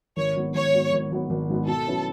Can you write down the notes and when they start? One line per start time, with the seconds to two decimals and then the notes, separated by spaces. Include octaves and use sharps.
0.17 G#1 C#5
0.36 G#2 F#3 B3
0.55 G#1 C#5
0.74 G#2 F#3 B3
0.93 G#1
1.11 G#2 F#3 B3
1.30 G#1
1.50 G#2 F#3 B3
1.67 B2 A4
1.87 F#3 C#4 E4 B4